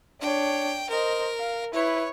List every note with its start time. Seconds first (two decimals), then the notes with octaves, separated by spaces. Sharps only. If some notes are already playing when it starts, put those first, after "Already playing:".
0.21 D4 C#5 G5
0.89 A#4 C5 D#5
1.39 F5
1.74 E4 B4 C#5